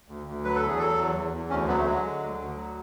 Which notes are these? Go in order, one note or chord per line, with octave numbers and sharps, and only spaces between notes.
D2
D2
F#3 B4
A4
E2 G#4
F#3 A4
E2
E2
E2
D2 C#4
F#3 B3
A3
F#3 G#3
D3
D2
D2
F#3